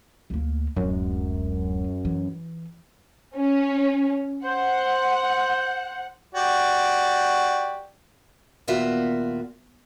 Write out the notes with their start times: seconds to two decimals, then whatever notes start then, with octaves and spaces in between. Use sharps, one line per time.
0.30 D2 A#3
0.76 D1 F#2 G#3
2.05 E3
3.36 C#4
4.45 C5 F#5
6.35 F#4 G4 D5
8.68 D#2 A#2 B3 F4 F#4 E5